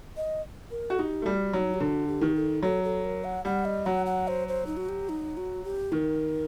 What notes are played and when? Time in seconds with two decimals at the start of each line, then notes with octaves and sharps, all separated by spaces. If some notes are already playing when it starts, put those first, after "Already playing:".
0.17 D#5
0.71 A#4
0.90 F#4 A4
0.99 D#4 G4
1.22 A3
1.26 G3 F#4
1.53 F#3 D#4
1.74 G4
1.80 D3 F#4
2.07 G4
2.21 D#3
2.36 A4
2.63 F#3 A4
2.84 A4
3.05 A#4
3.24 F#5
3.45 G3 F#5
3.65 D#5
3.86 F#3 F#5
4.06 F#5
4.28 C5
4.48 C5
4.66 D#4
4.77 F#4
4.89 G4
5.09 D#4
5.37 F#4
5.64 G4
5.92 D#3 A#4